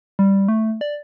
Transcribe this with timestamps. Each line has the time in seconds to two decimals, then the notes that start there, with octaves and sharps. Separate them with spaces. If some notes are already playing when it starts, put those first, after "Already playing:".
0.19 G3
0.48 A3
0.81 D5